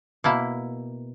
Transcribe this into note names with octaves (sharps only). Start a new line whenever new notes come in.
B2 A#3 E4